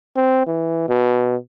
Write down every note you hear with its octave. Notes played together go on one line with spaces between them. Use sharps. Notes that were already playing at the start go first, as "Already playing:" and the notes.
C4
E3
B2